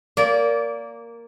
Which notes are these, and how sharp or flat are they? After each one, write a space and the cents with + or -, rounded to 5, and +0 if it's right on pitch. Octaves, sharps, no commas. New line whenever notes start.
A#3 +0 D5 -25